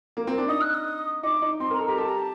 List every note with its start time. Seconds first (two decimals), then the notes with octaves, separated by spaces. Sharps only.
0.17 A#3
0.27 C4
0.38 D4
0.48 D#4 D#6
0.61 F#6
0.74 D#6
1.23 D#4 D6
1.42 D#4
1.60 C4 C6
1.70 A#4 A#5
1.79 A4
1.86 G4 A#5
1.98 G4 A5
2.09 A#5
2.19 A5